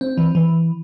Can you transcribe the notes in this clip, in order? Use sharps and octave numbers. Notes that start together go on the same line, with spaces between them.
C4
E3
E3